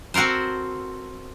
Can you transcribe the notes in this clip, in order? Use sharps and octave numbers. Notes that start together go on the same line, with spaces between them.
C4 F#4 A4 A#4 C5